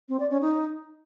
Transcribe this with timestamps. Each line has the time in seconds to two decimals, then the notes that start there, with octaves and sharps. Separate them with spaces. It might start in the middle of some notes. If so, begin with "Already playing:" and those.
0.09 C4
0.20 D5
0.30 C#4
0.41 D#4